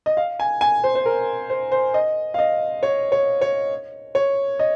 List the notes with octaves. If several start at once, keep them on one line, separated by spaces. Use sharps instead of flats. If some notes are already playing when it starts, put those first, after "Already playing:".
D#5
F5
G#5
G#5
C5
C5
A#4
C5
C5
D#5
F5
D#5
C#5
C#5
C#5
C#5
D#5